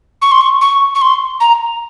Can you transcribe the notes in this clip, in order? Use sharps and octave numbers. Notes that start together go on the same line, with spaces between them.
C#6
C6
C#6
C#6
C#6
C6
A#5